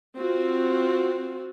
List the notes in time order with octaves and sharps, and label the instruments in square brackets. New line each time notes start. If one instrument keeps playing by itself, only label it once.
[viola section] C4 F4 F#4